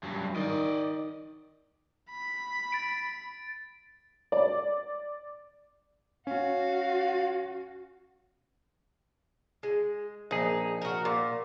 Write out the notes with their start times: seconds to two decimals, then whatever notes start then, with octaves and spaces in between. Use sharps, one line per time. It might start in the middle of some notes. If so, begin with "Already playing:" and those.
0.03 G2 F#3
0.36 D#3 D5 D#5
2.10 B5
2.72 A6 D7
4.32 D5
6.27 C#4 F#4 F5
9.63 G#3
10.31 A#1 D#4 G#4
10.82 F#4 A#4
11.05 A#2